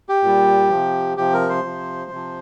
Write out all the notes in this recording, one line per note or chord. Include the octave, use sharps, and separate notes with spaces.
G4
A#2 G3
C3 F3
C3 F3 G4
A#4
C5
C3 F3
C3 F3